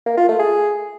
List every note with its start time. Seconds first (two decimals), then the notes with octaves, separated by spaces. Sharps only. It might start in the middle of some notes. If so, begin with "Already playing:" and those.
0.07 A#3
0.18 F4
0.28 A3
0.39 G#4